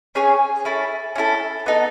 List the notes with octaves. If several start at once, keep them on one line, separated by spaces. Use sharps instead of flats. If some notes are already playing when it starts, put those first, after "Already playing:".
C#4 G#4 C#5 G#5
C#4 E4 A4
C#4 E4 A4
B3 D#4 A4